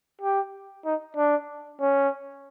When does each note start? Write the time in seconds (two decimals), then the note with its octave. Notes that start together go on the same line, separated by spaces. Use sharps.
0.21 G4
0.85 D#4
1.17 D4
1.81 C#4